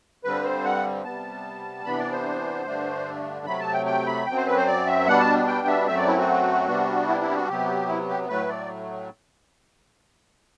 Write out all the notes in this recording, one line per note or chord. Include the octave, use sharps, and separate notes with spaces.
G2 D3 G3 C4 B4
C5
F#5
C3 G3 B3 A5
C3 E3 B3 D4 B5
D5
C5
G2 D3 A3 D4
C3 F#3 A3 B5
A5
G5
G5
B5
F#2 F#3 C4 G5
C5
B4
C5
D5
E5
B2 G3 B3 D4 F#5
A5
G5
E5
F#2 F#3 A3 C4 E5
D5
E4
F#4
C3 G3 B3 D4
E4
E4
G4
F#4
C3 F#3 B3 G4
E4
G4
A2 F#3 A3 B4
D5